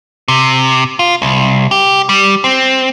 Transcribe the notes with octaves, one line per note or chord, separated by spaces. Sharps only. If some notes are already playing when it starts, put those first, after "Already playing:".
C3
F4
C2
G4
G3
C4